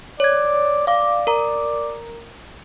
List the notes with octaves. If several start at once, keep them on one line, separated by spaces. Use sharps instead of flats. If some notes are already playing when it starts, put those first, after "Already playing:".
C#5 D5 G#6
D5 F5 D6
A#4 A#5